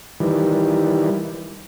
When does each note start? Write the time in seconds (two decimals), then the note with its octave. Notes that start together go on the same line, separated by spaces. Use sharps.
0.20 D#3 E3 G3